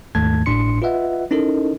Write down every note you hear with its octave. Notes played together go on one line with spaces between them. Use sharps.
D#2 G#2 D#3 A3 A5 G#6
G#1 A2 D4 C6 C#7
F4 B4 D#5 E5 F#5
C#4 D#4 E4 A4 A#4 D#5